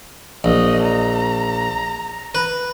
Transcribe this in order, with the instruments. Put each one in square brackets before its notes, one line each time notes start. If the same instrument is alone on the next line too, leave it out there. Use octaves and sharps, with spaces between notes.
[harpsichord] A#1 [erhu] D#5
[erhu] A#5
[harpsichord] B4